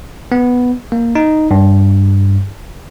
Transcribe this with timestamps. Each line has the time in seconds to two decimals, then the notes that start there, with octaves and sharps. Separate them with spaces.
0.32 B3
0.92 A#3
1.15 D#4
1.51 G2